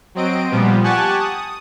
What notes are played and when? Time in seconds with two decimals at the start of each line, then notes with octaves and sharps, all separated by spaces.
0.15 F#3 C4 D#5 D7
0.51 A#2 F3 G3 B3
0.84 G4 F#5 G#5 A5 C#6 F#6
1.19 D#6